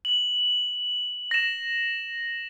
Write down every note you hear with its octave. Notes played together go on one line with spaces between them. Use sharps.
F#7
A#6 E7